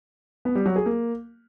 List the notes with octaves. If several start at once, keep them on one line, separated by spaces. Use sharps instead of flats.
B3
G3
F#3
G#4
A#3